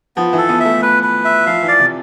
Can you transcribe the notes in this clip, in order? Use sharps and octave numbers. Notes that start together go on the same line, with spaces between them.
F3 B3
E3
A4
B3
E5
A3
B4
B4
E5
F3 F5
E3
D5
C3